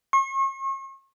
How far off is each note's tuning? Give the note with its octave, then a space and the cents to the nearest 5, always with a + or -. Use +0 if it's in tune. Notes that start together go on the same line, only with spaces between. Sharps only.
C#6 -40